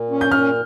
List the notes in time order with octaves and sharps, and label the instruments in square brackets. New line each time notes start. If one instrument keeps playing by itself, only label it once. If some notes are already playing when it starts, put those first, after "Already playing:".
Already playing: [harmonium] A#2
C#4
[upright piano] G6
[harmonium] A#2 [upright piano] F6